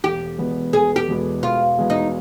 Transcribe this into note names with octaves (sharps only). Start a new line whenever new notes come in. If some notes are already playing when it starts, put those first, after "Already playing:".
E1 G4
E2 B2 G#3 B3
E1 G#4
G4
E2 B2 G#3 B3
E1 F4
E2 B2 G#3 B3
D#4